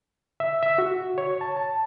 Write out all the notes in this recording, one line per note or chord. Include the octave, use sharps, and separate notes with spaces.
E5
E5
F#4
C#5
A5
A5